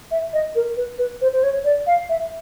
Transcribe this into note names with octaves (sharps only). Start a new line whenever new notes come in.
E5
D#5
A#4
B4
B4
C5
C5
C#5
D5
F5
E5